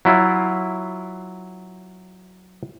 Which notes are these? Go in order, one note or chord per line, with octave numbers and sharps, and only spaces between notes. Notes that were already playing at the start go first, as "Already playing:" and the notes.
F#3 E4 F4